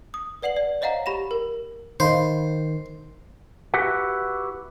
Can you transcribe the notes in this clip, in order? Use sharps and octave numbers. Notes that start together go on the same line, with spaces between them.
D#6
B4 D5 F#5 C7 F#7
D5
C5 C#5 D#5 F5 F#5 A#5
G4 B5 A#6 E7
A#4
D#3 C5 D#5 F5 B5
E4 F#4 G4 B4 F#5